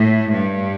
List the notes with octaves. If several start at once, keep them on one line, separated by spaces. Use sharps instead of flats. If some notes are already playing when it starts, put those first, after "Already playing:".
Already playing: A2
G2